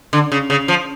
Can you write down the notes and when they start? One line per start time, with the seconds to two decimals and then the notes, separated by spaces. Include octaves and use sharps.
0.13 D3
0.32 C#3
0.50 C#3
0.68 F3